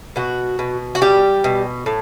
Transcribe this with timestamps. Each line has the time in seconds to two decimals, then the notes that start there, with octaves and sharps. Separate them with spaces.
0.16 B2 F#4
0.59 B2
0.95 F#4
1.01 G3 G4
1.44 B2
1.86 A2